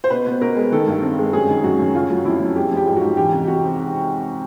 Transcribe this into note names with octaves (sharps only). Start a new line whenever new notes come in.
C5
B2 B4
B2
B2 A#4
G#3
D#3 A4
G2
C4
G#3
F#2 G#4
D#3
F#2 F#4
F#2
C#3 F4
F#3
F2 E4
F2
G#3 G4
F3
G4
G#2
G#2 F#4
E3 G4
C3
C3 F#4
C4